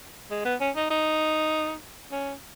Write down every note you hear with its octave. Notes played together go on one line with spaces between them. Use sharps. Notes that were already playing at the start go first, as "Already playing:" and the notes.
G#3
B3
C#4
D#4
D#4
C#4